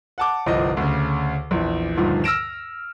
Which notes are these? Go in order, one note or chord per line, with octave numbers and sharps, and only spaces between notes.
F#5 A5 D6
G1 C2 F3 C5 D#5
D2 C#3
A#1 E2
D2 G2 A#2 D#3 F3
E6 F6 A#6 D7 E7